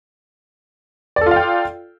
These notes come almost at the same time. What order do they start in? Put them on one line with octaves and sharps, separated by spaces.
D5 A4 F4 F5 G5